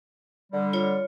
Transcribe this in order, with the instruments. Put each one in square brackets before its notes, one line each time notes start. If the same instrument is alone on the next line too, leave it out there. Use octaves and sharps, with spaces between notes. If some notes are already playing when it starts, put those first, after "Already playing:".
[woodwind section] D3 G3
[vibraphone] F4 C#5